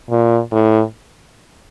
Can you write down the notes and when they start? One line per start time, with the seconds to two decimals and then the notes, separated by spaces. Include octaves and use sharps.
0.10 A#2
0.52 A2